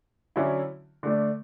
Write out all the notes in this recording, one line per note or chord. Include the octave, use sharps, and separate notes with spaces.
D3 F#3 C#4 E4
D3 A3 D4